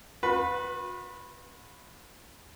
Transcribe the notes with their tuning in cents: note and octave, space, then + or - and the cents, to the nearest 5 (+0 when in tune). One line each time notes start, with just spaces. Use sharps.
F#4 -45 B4 +0